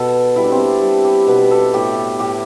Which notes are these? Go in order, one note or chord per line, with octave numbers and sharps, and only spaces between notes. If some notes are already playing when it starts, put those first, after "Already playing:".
Already playing: B2 A4
G3 E4
D4
C4
D4
G3
G4
B2 B4
A4
A2 G4
A2 G4